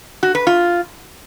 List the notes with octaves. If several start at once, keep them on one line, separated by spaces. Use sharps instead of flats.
F#4
B4
F4